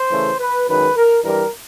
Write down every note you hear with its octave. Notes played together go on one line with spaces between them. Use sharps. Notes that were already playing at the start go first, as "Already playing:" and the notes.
Already playing: C5
C#3 E3 A3
B4
F#2 D#3 G#3 B4
A#4
G2 E3 G3 A#4